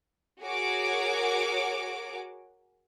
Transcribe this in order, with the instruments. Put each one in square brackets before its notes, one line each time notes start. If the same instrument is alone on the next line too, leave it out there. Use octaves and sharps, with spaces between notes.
[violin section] F#4 G#4 A#4 C#5 D6